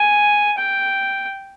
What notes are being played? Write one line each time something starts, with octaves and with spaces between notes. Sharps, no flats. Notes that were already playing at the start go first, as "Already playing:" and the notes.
Already playing: G#5
G5